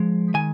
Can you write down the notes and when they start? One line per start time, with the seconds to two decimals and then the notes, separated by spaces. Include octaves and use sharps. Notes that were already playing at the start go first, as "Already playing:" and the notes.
Already playing: F3 G#3
0.34 D#3 G#5